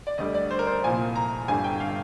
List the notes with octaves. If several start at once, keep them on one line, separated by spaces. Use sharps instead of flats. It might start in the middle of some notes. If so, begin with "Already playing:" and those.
D5
D2 D3 G3 D#5
D5
C5
A#4
C5
C2 A#2 F3 G#5
A#5
G1 G2 D3 G3 G#5
G5
F5